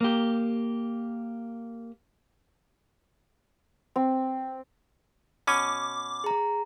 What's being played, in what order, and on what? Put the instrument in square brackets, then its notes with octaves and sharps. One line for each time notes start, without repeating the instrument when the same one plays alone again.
[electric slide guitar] A#3 G4
[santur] C4
[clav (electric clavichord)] B2 C#4 G#5 [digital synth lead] D6
[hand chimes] G#4 A#5